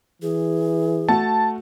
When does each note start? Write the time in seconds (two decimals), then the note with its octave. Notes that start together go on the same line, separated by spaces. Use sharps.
0.22 E3 G#4
1.09 A3 F#4 A5